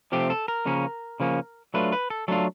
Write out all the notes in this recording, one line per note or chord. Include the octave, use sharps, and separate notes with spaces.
C3 F3 A3 C4 G4
A4
A#4
C#3 F3 A#3 C#4
C#3 F3 A#3 C#4
F#3 A3 D4 F4 B4
B4
A4
F#3 A3 D4 F4 A4